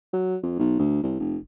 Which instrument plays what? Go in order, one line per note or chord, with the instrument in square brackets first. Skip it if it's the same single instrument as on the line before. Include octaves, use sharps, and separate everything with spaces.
[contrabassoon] F#3
F2
B1
D2
C2
F1